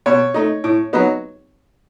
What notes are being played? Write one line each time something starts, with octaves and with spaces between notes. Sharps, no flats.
B2 C#5
A3 D#4
A2
F#3 B3 D#4